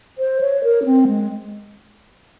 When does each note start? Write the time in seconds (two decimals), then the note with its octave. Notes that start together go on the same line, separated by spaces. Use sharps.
0.18 C5
0.41 C#5
0.64 A#4
0.82 C#4
0.85 C4
1.08 G#3